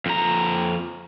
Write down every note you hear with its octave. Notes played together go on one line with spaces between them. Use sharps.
F2 A#5